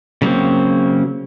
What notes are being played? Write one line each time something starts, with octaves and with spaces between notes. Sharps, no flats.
C#3 F#3 A#3 C4